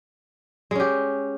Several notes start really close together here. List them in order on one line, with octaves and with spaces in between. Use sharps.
G#3 C#4 G4